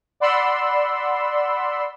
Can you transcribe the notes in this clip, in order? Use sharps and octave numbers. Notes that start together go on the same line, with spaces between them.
D5 F#5 B5 C6 E6